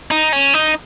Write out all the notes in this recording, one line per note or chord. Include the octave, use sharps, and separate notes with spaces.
D#4
C#4
D#4